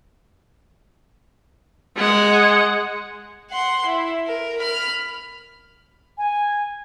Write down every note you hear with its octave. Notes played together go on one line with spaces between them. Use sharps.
G#3 F#5
F#5 C6
E4
A#4
B5 F6
G#5